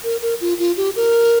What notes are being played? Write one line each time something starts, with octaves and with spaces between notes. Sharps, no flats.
A#4
A#4
F4
F4
G4
A#4